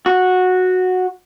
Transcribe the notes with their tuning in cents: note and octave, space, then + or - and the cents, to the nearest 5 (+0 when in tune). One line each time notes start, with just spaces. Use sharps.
F#4 -10